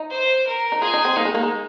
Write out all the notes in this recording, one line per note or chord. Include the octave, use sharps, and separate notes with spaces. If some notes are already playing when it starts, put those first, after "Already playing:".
Already playing: D#4
C5
A#4
D#4
F4 G#4
D#4
C4
A#3 D#4
G#3
A#3
G#3